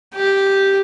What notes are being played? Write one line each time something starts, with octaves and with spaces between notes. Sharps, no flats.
G4